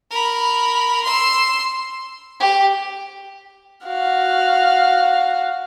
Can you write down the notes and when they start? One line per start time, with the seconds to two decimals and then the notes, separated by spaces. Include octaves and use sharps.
0.11 A#4 B5
1.04 C6 E6
2.40 G4
3.85 F#4 F5